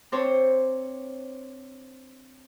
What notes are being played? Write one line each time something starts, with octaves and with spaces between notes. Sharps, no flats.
C4 D4 C5 C#5